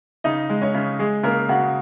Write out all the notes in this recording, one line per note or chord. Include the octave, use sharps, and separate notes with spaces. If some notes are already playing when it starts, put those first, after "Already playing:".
C#3 D#4 D#5
G#3
C#4 C#5
C#3
G#3 G#4
C#3 A#3 A#4
C#3 F#4 F#5